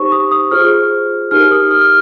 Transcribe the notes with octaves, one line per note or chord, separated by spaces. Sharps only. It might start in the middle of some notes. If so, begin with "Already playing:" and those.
Already playing: D#4 G4 C5 C#6
D#6
D#6
F4 G#4 C5 F6
D#4 G4 A#4 F6
D#6
F6
F6